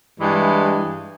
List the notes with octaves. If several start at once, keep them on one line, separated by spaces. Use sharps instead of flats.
G2 E3 G#3